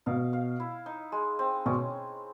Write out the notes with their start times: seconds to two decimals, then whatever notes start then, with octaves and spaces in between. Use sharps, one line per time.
0.06 B2 F5
0.33 F5
0.60 E4
0.86 D#4
1.12 G#3
1.39 C4
1.66 B2 C#4